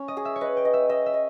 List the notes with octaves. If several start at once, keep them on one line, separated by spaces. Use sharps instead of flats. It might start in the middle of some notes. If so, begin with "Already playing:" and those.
Already playing: C#4
D#5
G#4
E5
C#5
B4 D#5
G5
D#5
E5
D#5 E5
E5
D#5